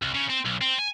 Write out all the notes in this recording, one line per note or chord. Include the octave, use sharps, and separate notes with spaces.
C2
C#3
C4
B1
C4
G#5